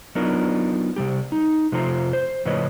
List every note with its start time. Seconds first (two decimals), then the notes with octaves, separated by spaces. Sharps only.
0.15 F#3 B3 D4 D#4 F4 A#4
0.96 C3 G3 G4
1.32 D#4
1.72 C3 F3 A3 F4 C5 A#5
2.13 C5
2.45 A2 C#3 F3 B4 C#5 D#5